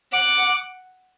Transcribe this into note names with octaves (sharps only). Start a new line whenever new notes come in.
F#5 D6